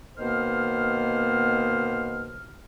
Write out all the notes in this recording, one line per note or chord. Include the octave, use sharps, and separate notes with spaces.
B2 D#3 A#3 B3 C5 F6